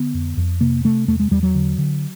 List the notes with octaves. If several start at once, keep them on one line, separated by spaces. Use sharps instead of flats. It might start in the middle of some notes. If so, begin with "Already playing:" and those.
Already playing: D3 B3
F2
F2
C3 A#3
C3 A3
E2 A3
G#3
E2 G3
F#3
D3
D3